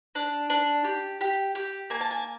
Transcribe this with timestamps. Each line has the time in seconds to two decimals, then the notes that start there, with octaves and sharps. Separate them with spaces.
0.15 D4
0.50 D4
0.85 G4
1.21 G4
1.55 G4
1.90 A#3 G#5
2.01 A5
2.11 G#5